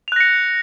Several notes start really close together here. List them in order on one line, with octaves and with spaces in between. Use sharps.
F7 F#6 A#6 C#7